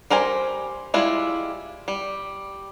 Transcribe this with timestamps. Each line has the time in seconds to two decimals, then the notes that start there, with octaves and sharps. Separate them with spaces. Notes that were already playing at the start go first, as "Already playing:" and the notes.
0.10 G3 A#4 C5 G#5
0.94 G3 G#3 E4 F4
1.88 G3